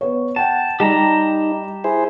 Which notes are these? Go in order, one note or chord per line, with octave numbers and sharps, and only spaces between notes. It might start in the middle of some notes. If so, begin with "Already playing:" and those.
B3 C#5
F#5 G5 A5
G3 D#4 G4 A5 A#5
E4 G#4 C5